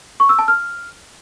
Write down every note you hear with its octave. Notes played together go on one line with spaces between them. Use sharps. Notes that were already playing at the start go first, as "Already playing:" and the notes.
C#6
E6
A5
F6